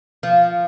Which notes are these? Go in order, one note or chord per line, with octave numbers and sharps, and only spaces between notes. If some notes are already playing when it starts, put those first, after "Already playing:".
F3